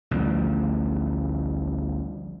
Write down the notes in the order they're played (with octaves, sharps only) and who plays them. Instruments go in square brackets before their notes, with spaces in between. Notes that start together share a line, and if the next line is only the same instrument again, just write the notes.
[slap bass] A1 D2 F3 G3